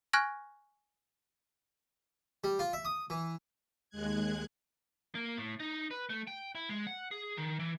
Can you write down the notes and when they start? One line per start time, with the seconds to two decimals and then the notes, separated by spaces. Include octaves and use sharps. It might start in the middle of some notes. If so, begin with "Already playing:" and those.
0.13 G#5 C#6 F6 F#6 G#6 A#6
2.44 G3
2.59 F4
2.73 E5
2.85 D#6
3.10 E3
3.90 D#2 G#3 F#6 G#6
5.15 A#3
5.38 A2
5.60 D#4
5.91 B4
6.10 A3
6.27 G5
6.55 E4
6.69 G#3
6.87 F#5
7.11 G#4
7.37 D#3
7.59 E3